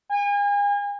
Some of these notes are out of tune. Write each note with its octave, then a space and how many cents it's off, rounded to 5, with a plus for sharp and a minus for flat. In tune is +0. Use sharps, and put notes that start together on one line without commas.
G#5 -40